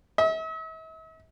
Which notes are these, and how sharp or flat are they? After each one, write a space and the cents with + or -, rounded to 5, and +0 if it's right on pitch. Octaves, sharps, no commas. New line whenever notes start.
E5 -45